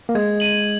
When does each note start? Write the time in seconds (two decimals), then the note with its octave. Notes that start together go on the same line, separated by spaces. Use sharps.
0.09 A#3
0.15 G#3 G#6
0.40 D#7 F#7